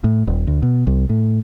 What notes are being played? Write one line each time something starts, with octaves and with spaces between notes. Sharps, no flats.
A2
D#1
D2
B2
C2
A2